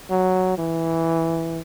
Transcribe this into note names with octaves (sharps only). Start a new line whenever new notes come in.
F#3
E3